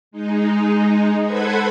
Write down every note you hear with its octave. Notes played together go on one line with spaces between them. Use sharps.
G#3 D#4
A4 B4 C5 F#5 B5 G#6